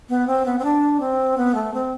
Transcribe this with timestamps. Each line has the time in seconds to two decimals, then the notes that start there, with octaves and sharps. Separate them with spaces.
0.09 B3
0.27 C4
0.46 B3
0.59 C4
0.64 D4
1.00 C4
1.38 B3
1.55 A3
1.73 C4